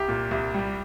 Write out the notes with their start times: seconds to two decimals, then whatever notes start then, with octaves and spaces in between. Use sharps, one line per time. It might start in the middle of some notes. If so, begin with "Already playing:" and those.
Already playing: C2 G4
0.08 A#2
0.31 C2
0.54 G3